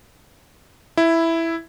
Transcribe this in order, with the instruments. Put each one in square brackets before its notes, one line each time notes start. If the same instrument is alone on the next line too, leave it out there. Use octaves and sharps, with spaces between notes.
[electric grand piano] E4